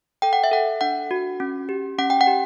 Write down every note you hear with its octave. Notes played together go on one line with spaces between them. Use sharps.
A4 G5
F#5
E5
A4 F#5
D4 F#5
F#4
C#4
G4
C#4 F#5
G5
F#5
G4